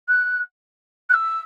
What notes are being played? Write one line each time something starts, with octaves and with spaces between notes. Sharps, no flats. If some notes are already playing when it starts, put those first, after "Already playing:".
F#6
F#6
E6